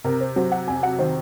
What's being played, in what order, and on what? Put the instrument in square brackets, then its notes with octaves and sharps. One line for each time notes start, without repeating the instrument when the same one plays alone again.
[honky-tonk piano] C3 [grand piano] A#4
[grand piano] C5
[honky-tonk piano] F#3 [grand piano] C5
[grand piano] F#5
[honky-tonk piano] F2 [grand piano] G#5
[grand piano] F#5
[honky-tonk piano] D#3 [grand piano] C5